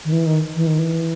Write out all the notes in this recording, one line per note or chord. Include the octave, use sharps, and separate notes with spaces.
D#3
E3
D#3
E3
D#3
E3